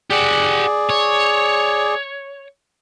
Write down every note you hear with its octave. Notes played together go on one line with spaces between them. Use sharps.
G4 G#4 D5 F#5
C#5